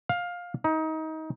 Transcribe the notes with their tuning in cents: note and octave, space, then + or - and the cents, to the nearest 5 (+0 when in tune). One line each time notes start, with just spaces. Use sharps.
F5 +15
D#4 +25